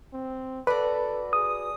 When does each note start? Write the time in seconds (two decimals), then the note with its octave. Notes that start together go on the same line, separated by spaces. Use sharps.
0.13 C4
0.67 F#4 A4 B4 D5
1.33 G#4 D#6